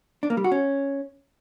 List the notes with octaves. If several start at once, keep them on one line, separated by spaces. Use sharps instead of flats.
D4
A#3
G3
F#4
C#4